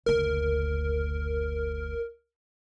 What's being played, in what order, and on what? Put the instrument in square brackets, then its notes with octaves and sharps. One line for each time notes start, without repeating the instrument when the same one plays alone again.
[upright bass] F#1 D2 [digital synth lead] A#4